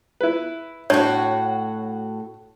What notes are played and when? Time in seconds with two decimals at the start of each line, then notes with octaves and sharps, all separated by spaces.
0.21 E4 B4
0.90 A2 D4 F#4 C#5